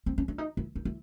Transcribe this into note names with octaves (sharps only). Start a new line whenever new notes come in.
C4
C#4
D4
D#4
E4
D#4
E4